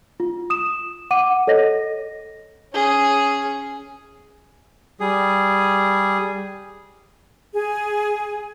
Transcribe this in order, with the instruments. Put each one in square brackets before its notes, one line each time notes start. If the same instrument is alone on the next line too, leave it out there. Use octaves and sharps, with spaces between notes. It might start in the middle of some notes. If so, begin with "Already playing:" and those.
[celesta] F4
D#6 E7
F#5 D6 D#7
A4 C#5 D#5 A#6
[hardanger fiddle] C#4 G#4
[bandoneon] G3 G#4
[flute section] G#4